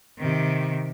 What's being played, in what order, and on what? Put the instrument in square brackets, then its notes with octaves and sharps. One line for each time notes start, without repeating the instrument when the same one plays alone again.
[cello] C3 D#3